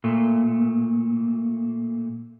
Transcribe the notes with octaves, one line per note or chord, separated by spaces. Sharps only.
A#2 A3